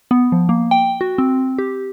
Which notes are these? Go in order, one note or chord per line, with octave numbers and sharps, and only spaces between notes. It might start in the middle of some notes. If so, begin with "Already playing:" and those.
B3
F3
A#3
G5
F#4
C4
G4